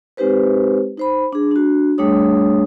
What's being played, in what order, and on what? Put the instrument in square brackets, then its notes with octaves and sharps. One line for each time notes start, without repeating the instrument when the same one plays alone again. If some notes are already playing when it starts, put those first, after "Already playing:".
[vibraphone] G#3 C4 D#4 G4 B4 C5
D#4 C5 B5
D4 G#4
D4 F#4
G3 A3 D4 G#4 C#5 D#6